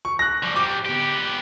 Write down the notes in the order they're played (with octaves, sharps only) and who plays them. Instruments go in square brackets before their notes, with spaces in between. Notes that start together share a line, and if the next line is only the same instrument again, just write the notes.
[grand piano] C#6
F#6 A#6
[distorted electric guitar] F3 G3
[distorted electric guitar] G#2 G3 [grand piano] D6
[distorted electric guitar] B3 G4